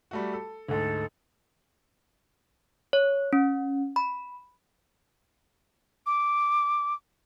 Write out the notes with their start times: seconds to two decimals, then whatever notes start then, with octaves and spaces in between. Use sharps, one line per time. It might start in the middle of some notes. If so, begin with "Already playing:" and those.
0.11 G3 A3 F#4
0.34 A4
0.69 D2 G#2 A4
2.93 C#5
3.33 C#4
3.96 B5
6.06 D6